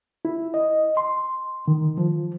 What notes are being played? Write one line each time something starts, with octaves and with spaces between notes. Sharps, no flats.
E4
D#5
C6
D#3
F3